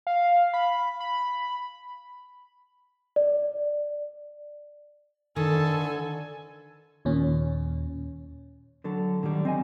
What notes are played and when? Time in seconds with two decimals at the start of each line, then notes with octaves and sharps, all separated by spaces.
0.07 F5
0.54 B5
1.00 B5
3.16 D5
5.36 D3 D#3 A4 G#5
7.05 D#2 A#2 C#4
8.84 D3 F#3 A4
9.23 D3 D#3 F#3 G3
9.45 C4 D#5 G#5